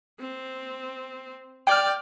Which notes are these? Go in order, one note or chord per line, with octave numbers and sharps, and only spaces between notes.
C4
D5 G5 F6